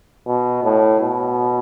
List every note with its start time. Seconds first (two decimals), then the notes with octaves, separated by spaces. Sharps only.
0.27 B2
0.64 A2
1.01 B2